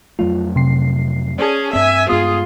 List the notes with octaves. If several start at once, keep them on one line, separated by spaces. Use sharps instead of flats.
F2 F#3 A3 F4
C3 C7
C#4 G#4 D5 A5
G2 C4 E5 G#5
G2 G#3 B3 F4 G#4 D#6